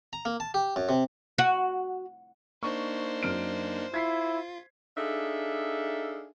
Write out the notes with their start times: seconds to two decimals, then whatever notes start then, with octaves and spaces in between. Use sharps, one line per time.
0.13 A#5
0.25 A#3
0.40 A5
0.54 G4
0.76 F#2
0.89 C3
1.38 F#4
2.63 A#3 D4 D#4 C5 C#6
3.23 F#2 F6 D7
3.94 E4 F4 G#6 B6 C7
4.98 D4 D#4 G#4 A4 E5 F5